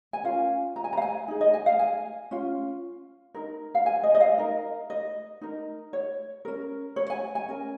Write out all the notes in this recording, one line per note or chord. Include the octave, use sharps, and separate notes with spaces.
G#5
C#4 F4 A#4 F5
A#5
G#5
A#5
F5
G#5
D#4 G#4
D#5
G#5
F5
G#5
C#4 F4
D#4 A#4
F5
G#5
D#5
D#5
F5
D#4 A#4
D#5
D#4 A#4
C#5
C#4 A#4
C#5
G#5
G#5
C#4 A#4